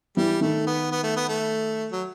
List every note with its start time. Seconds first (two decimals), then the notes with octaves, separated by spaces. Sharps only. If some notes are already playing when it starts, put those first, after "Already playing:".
0.17 E3 G3
0.41 D#3 A3
0.67 B3
0.92 B3
1.03 A3
1.16 B3
1.29 A3
1.91 F#3